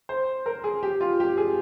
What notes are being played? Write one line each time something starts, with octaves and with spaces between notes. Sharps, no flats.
C5
A#4
G#4
G4
F4
G4
G#4